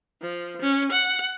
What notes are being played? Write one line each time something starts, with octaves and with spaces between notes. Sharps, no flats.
F3
C#4
F#5